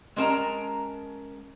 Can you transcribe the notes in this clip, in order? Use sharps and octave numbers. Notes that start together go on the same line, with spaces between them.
G#3 C#4 A#4 A5 A#5